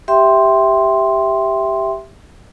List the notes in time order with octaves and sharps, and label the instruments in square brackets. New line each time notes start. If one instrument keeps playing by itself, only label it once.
[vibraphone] G4 E5 G5 C6